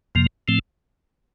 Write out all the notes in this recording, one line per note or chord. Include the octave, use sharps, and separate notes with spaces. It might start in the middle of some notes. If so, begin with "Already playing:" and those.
F2 C3 F3 A#3
A2 F3 A3 C4